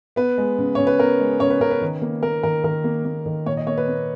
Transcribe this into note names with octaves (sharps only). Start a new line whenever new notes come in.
B3 B4
G#3
C#3
C#3 C#5
B4
B3 A#4
G#3
C#3 C#5
B4
C#3 A#4
B4
D#3
A#3
A#3 A#4
D#3 A#4
D#3 A#4
A#3
A#3
D#3
A#2 C#5
D#5
A#3 C#5
B4
A#3